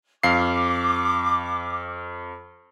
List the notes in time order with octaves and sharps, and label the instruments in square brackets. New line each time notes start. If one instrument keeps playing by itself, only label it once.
[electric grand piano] F2 F5 C7 [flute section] D6